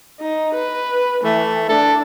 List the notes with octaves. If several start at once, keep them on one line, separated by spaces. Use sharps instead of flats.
D#4
B4
E3 A3
D4 A4